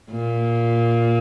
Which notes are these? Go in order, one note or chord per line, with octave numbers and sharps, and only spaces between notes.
A#2